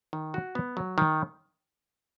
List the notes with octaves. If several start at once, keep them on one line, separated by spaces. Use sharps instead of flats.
D#3
F#4
B3
F#3
D#3